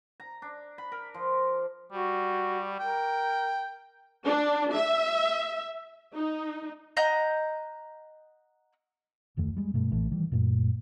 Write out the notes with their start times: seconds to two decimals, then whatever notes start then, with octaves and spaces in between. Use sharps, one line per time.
0.20 A#5
0.42 D4
0.78 B5
0.92 A#4
1.14 F3
1.92 G3 F#4
2.79 A#4 G5
4.26 D4
4.74 E5
6.15 D#4
6.97 D#5 F#5 A#5 G6
9.37 D1 F2 D#3 A3
9.57 G3 G#3
9.73 G2 B2 A3
9.92 A#1 A2 E3 A3
10.11 D#3 E3 G3
10.32 F#2 A#2 A3